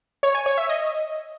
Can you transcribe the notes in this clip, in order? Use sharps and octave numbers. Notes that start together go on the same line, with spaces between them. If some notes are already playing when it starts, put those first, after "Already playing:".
C#5
G#5
C#5
E5
D#5